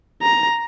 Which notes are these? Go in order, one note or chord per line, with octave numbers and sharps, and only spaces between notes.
A#5